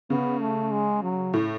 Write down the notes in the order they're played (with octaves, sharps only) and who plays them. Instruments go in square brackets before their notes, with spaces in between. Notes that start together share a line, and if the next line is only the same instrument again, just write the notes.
[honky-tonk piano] C#3 [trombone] B3
[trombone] A3
G#3
F#3
[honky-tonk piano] A2